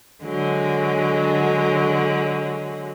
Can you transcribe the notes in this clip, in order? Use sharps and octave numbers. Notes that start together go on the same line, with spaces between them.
D3 F#3 G#3